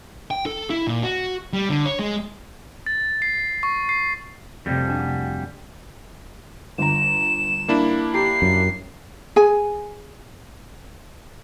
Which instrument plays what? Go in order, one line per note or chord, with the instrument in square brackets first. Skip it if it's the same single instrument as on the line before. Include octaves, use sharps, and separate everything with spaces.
[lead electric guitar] G5
A4
E4
A#2
F#4
G3
D3
C#5
G#3
[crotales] A6
C7
C#6
C7
[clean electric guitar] F2 G3 [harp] C3 A3
[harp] D4 F#4 G#5
[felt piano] G1 A#5 [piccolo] E7
[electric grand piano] A#3 D4 E4
[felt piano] G4 A#5 [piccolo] C7
[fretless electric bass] F#2
[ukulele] G#4 G#5